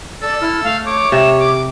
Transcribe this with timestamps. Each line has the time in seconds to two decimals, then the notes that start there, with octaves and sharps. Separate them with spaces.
0.22 A4 D5
0.41 E4 F6
0.64 A3 F5
0.86 C#5 D6
1.12 C3 G4 E7
1.39 D6